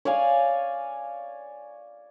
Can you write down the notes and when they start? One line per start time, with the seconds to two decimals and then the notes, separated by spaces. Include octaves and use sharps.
0.05 C#5 D5 F5 G#5